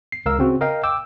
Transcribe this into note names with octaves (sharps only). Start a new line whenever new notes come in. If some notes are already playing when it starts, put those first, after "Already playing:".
C7
C#2 A#4 F5 E6
C#3 C4 F#4
A#4 D#5 F5 G5
G5 D6 E6